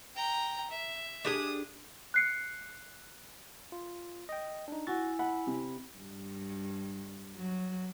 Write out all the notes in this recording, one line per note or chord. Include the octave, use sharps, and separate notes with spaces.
G5 A#5
E5
D4 G4 G#4 D#6
F#6 C7 C#7
F4
D#5 G5
D4 D#4
E4 F#4 G#5 A6
F#5 B5
C3
G2
F#3